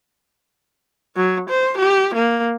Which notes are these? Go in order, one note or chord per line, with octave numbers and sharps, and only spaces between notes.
F#3
C5
G4
A#3